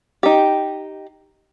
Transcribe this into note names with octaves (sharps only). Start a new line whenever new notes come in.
D#4 G4